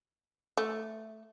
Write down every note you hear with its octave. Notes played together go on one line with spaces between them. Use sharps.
A3